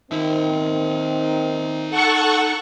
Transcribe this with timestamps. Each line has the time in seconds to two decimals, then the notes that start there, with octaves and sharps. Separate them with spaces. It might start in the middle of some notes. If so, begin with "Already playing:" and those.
0.11 D#3 C4 D#4 E5
1.90 A4 F#5 C#6